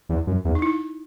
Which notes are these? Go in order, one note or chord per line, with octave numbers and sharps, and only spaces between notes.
E2
F#2
E2
D#4
E4